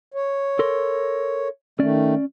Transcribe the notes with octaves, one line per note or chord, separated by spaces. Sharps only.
C#5
A4 A#4 C6
D#3 A3 C#4 D5